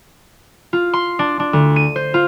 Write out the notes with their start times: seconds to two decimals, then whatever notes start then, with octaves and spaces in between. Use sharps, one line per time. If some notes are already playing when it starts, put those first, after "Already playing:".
0.73 F4
0.93 C6
1.19 D4
1.40 D4
1.53 D2
1.76 D#7
1.96 C5
2.14 F4